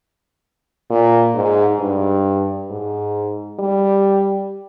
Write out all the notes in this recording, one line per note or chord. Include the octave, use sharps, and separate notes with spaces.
A#2
G#2
G2
G#2
G3